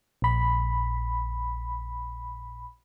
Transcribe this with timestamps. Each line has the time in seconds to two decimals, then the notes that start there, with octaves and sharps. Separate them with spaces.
0.22 A#1 B5